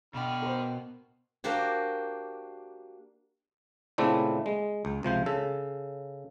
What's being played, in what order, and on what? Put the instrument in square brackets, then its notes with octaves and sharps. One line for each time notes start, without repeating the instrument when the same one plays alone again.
[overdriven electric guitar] B2 [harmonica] D3 B5 F6 [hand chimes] B3 G5
[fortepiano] A#4 C5
[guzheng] A#3 D4 F#4 G4 C5
[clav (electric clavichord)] A#2 C#3 A3 C4 D4 E4
G#3
C#2
C#2 C3 F3 C5
C#3 A4